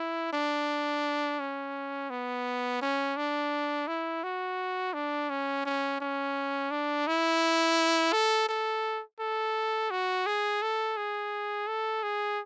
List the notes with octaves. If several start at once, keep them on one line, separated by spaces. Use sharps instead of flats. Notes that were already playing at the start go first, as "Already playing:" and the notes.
Already playing: E4
D4
C#4
B3
C#4
D4
E4
F#4
D4
C#4
C#4
C#4
D4
E4
A4
A4
A4
F#4
G#4
A4
G#4
A4
G#4